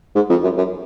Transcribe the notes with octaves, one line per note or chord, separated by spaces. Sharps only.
G#2
F2
F#2
F#2